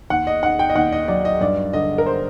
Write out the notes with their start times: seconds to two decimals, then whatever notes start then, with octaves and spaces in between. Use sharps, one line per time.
0.10 D#2 F#5
0.27 D#5
0.43 D#3 F#5
0.59 G5
0.70 D#5
0.75 D#2 F#5
0.92 D#5
1.08 F#3 D5
1.25 D#5
1.41 G2 D5
1.73 D3 D#5
1.98 A#4
2.06 C5